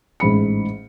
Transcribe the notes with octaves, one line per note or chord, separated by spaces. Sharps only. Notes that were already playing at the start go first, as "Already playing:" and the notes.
A1 G#2 B5 C#7